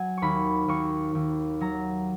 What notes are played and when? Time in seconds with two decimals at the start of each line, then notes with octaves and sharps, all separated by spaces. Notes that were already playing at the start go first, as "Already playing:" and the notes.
Already playing: F#3 F#5 G#5
0.17 D#2 B5 C#6
0.68 D#2 C#6
1.15 D#2
1.61 F#3 A#5